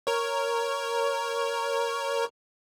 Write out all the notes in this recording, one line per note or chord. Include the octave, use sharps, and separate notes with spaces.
A#4 C#5